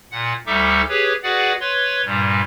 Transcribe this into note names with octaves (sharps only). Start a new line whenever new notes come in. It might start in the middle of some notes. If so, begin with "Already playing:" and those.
A#2 F#5
D2 G3 D#4 A4 E5 D6
G4 G#4 B4 C#5
F#4 G#4 B4 D5 F#5
B4 C#5 C6
G2 A#2 G3